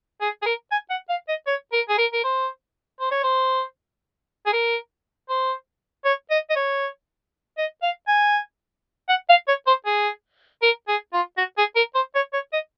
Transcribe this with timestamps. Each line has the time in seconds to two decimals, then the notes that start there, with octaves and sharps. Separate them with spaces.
0.21 G#4
0.42 G#4
0.46 A#4
0.71 G#5
0.90 F#5
1.10 F5
1.28 D#5
1.47 C#5
1.73 A#4
1.89 G#4
1.98 A#4
2.13 A#4
2.24 C5
3.00 C5
3.12 C#5
3.23 C5
4.46 G#4
4.53 A#4
5.29 C5
6.05 C#5
6.30 D#5
6.50 D#5
6.56 C#5
7.58 D#5
7.83 F5
8.08 G#5
9.09 F#5
9.29 F5
9.48 C#5
9.67 C5
9.86 G#4
10.62 A#4
10.88 G#4
11.13 F4
11.38 F#4
11.58 G#4
11.76 A#4
11.95 C5
12.15 C#5
12.33 C#5
12.53 D#5